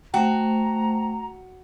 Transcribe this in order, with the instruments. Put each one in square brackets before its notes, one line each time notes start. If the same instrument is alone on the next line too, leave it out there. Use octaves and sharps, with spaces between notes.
[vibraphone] A3 C5 [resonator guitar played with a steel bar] F#4 [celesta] G5 [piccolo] A#5